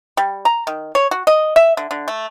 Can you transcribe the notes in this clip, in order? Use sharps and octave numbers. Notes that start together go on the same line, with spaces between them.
G3
A#5
D#3
C#5
F#4
D#5
E5
D3
D3
A3